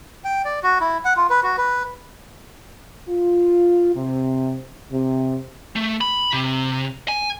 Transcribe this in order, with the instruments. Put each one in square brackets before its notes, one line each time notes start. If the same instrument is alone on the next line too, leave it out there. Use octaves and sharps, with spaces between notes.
[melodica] G5
D5
F#4
E4
F#5
F4
B4
F#4
B4
[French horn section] F4
C3
C3
[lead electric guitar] A3
B5
C3
G#5